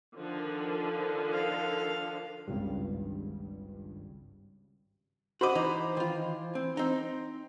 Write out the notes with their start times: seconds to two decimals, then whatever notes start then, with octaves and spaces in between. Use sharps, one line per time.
0.16 D3 D#3 F3
1.32 A4 F5
2.48 G#1 C#2 G2
5.41 F#4 C5 D#5 B5 D6
5.55 E3 D#4
5.97 D#3 F4
6.55 C4
6.77 C4 D#4